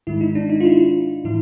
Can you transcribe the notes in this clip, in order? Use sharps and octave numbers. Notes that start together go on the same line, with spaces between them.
G#2 D#3 G#3 E4
D#4
D4
D#4
F4
E4
A2 E3 E4